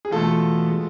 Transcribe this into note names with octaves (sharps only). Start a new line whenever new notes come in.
G#4
E2 B2 A3 F4 A4
G#3